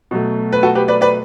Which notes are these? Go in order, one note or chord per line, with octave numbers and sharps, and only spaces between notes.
B2 F#3 A3
B4
F#4 A4
G4 B4
B4 D5
B4 D5